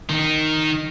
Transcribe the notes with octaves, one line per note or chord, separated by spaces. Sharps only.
D#3 D#4